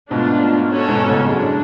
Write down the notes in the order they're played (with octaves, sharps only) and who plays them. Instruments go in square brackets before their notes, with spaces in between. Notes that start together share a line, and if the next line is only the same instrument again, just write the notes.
[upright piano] G#2 B2 [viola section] A3 D4 F4
[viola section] C#4 F#4 A4 C#5
[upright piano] G#2 B2
A2 C#3
[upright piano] F#2 [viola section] G#3 D4 F#4